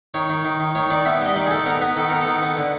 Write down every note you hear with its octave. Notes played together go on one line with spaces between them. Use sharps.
D#3 C#5
D#3
D#3
D#3
D#3 C#5
D#3 D5
B3 E5
G3 D#5
D#3 D5
G#4
D#3 A4
B3 A#4
B3 B4
D#3 A4
B3 A#4
A4
D#3
B3
D3